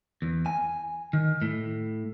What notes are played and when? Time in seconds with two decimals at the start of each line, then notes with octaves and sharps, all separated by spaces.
0.22 E2
0.46 G#5
1.13 D#3
1.42 A2